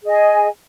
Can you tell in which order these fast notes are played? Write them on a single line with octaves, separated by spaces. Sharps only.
G#4 D#5 G#5